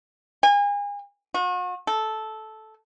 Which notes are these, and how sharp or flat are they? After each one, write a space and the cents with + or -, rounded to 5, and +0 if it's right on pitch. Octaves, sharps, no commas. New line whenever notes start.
G#5 -35
F#4 -40
A4 -10